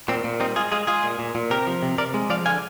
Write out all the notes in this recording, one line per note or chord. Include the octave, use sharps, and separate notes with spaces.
A#2 C4
A#2
G3 C4 D#4
G#3 F4 G#4
G#3 F4 G#4
G#3 F4 G#4
A#2
A#2
A#2
C3 G4 A#4
F3
C3
C3 A#4 D5
G#3
F3 D5 F5
D3 F5 G#5